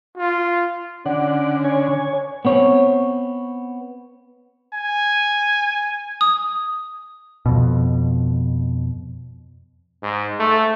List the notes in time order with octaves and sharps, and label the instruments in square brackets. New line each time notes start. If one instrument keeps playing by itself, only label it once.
[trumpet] F4
[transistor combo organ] D3 [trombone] C#4 [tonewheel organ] D5 F#5
[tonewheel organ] C#5 G#5
[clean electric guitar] B3 C4 C#5
[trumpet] G#5
[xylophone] D#6
[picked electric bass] F2 B2
[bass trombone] G#2
A3